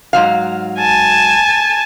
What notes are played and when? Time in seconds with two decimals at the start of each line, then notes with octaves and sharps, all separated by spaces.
0.13 G#2 F#3 F5
0.79 G#5 A5